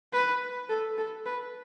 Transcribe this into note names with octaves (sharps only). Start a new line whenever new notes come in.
B4
A4
A4
B4